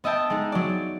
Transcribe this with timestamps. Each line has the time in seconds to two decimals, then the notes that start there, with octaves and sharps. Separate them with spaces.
0.04 B3 D#5 E5 G5 A5
0.30 G#3 D#4
0.52 F#3 D5